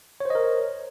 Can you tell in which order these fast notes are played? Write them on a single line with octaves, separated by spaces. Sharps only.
C#5 C5 D#5 A#4